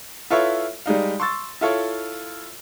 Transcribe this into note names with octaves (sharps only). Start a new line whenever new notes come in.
E4 F4 A4 B4 C#5 E5
G3 G#3 D#4 F5
C6 C#6 E6 A6
E4 F4 A4 C#5